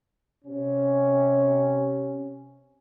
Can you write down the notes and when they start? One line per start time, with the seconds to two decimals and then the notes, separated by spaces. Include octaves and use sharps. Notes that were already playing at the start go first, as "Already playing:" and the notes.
0.45 C3 C#4